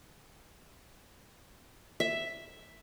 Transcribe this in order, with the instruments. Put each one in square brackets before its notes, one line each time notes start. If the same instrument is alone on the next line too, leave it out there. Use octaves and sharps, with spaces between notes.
[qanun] E5